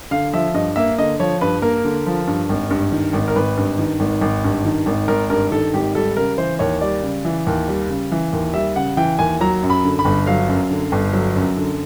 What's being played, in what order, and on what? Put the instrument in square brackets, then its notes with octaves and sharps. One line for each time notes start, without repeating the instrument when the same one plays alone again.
[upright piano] D3 F5
F3 E5
G2 D#5
A#3 E5
D3 D#5
F3 C#5
G2 B4
A#3 A#4
D3
F3
G2
G#1
G2
D#3
G#1
A#4
G#1 B4
G2
D#3
G#1
G#1
G2
D#3
G#1
G#1 A#4
G2 A#4
D#3 A4
G#1 G4
G3 A4
C#3 A#4
E3 C5
D#2 C#5
G3 D5
C#3
E3
D#2
G3
C#3
E3
D#2
G3 E5
C#3 F#5
E3 G5
D#2 G#5
F#3 A#5
F#2
B5
D3
B5
G1
F#3 F5
F#2
D3
G1
F#3
F#2
D3